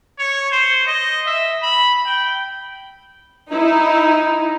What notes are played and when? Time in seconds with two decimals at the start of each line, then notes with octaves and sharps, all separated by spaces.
0.19 C#5
0.52 C5
0.87 D#5
1.27 E5
1.63 B5
2.07 G5
3.52 D#4 E4